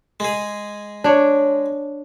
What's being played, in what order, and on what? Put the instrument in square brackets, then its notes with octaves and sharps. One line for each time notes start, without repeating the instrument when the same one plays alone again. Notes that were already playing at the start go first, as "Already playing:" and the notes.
[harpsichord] G#3 G#4
[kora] D4 C#5